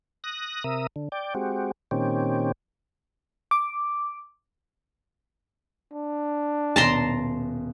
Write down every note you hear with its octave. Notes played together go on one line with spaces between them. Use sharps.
D#6 F#6 A#6
C3 A#4 E5 D#6
D3
D5 G5
G#3 C4 F#4 G4
A#2 D#3 C4 C#4 G4
D6
D4
D#1 B2 A5 A#5 C6 D7